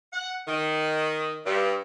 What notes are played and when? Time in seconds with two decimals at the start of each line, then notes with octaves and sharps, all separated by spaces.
0.13 F#5
0.47 D#3
1.46 G2